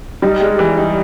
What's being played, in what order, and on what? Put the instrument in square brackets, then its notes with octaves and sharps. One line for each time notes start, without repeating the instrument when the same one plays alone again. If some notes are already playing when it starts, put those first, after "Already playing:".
[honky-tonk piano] G3 [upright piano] D#4
[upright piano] G#3
E3
D#4